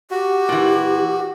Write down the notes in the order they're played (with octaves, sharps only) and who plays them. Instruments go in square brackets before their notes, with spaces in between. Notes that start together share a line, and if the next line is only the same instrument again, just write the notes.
[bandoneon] F#4 [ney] G4
[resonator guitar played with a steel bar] A#2 E3